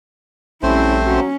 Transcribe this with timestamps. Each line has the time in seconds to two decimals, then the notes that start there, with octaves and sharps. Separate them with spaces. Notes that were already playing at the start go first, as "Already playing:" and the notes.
0.63 A#1 G3 A3 C4 C#4 E4 C5
1.06 F#3 C#4